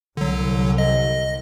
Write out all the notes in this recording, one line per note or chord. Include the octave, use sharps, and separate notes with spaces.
C2 D3 F#3
D#5